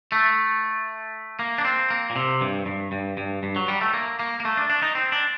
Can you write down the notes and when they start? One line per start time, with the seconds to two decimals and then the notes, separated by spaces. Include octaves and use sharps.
0.12 A3
1.39 A#3
1.58 D4
1.65 C4
1.91 A#3
2.10 A#2
2.16 C3
2.41 G2
2.66 G2
2.92 G2
3.17 G2
3.43 G2
3.56 F#3
3.68 G3
3.81 A3
3.94 A#3
4.20 A#3
4.40 A#3
4.45 A3
4.57 D4
4.70 D4
4.82 D#4
4.95 C4
5.12 D4